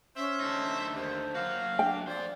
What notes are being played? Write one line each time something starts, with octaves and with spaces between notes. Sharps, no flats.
C#4 C5 E5
D3 A3 D#4
D#2 C5
F#3 A#3 F#4 F5
D4 G5
F2 C5 D5